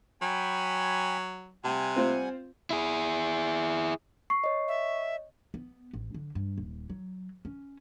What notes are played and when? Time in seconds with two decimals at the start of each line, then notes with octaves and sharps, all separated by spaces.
0.22 F#3 G5 G#5 B5
1.64 C3 G3 F#5 G#5 A5
1.96 C4 F4 C5
2.70 E4 G#4
4.30 C#6 C7
4.44 C#5 D#5
4.68 E5
5.54 B3
5.93 A1
6.14 D3
6.35 G2
6.58 D#1
6.90 F#3
7.45 C#4